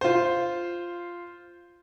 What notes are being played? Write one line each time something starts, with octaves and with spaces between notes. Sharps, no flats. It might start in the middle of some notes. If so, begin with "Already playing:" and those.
F4 C5